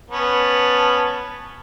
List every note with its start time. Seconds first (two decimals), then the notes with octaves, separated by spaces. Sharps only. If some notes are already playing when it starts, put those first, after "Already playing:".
0.10 B3 C#4 A5